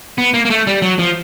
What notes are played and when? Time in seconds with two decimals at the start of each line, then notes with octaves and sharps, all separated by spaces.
0.18 B3
0.34 A#3
0.45 A#3
0.50 A3
0.67 G3
0.82 F#3
0.99 F3